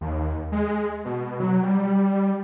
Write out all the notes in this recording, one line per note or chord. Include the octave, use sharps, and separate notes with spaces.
D#2
G#3
B2
F#3
G3